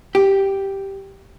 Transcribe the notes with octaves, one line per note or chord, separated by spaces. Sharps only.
G4